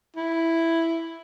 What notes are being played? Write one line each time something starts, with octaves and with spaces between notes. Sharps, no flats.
E4